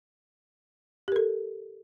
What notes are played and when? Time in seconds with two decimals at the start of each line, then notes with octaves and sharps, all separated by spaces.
1.08 G4
1.12 A#4
1.16 A4